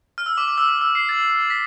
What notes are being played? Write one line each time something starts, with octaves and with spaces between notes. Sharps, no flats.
F6
E6
D6
D6
E6
D6
E6
C7
A6
B6